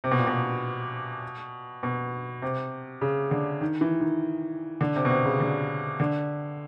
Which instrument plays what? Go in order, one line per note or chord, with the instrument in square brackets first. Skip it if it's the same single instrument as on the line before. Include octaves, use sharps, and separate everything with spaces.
[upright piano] C3
B2
A#2
B2
B2
C3
C#3
D3
D#3
E3
D#3
D3
C3
B2
C3
C#3
D3
D3